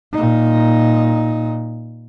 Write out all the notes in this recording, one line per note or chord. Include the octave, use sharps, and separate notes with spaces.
A#2 D#4